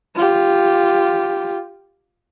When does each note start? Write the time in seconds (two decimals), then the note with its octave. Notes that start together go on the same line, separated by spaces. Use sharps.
0.16 F4 G4